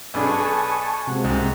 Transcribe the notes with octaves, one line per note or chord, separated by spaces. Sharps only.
B1 D4 G#4 B4 G#5 A5 C#6 D#6
C3 G#3 A#3 F#4
C2 G#2 C3